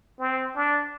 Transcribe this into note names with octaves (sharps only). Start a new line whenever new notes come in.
C4
D4